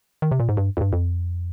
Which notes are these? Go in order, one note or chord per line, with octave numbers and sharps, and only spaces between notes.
D#3
C3
A#2
G#2
G2
F2
G2
F2